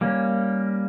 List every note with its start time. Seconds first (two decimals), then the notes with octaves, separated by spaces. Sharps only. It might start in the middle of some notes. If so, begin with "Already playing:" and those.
0.01 G3 A#3 C#4